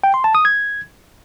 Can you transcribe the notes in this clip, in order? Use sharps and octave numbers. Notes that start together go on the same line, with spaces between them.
G5
C6
A5
D#6
G#6